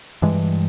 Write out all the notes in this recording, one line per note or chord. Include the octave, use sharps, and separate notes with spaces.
G2 E3 G#3